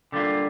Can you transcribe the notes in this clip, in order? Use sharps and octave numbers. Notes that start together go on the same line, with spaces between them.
D3 G3 A#3 F4